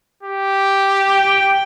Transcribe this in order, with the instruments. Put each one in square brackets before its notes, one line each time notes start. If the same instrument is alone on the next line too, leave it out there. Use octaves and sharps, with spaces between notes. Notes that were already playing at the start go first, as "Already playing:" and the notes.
[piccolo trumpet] G4
[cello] G5